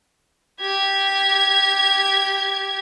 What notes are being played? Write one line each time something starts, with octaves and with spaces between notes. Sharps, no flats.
G4 G#6